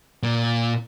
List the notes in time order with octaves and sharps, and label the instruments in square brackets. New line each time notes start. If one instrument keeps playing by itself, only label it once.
[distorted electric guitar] A#2